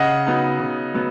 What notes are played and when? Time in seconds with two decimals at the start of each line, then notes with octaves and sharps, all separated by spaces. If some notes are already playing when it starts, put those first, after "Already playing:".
Already playing: C#3 D#5 F#5
0.27 F#3 B3 D#4
0.60 C#3
0.94 F#3 B3